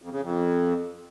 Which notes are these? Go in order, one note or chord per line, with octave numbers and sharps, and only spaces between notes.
F2
C#3
F2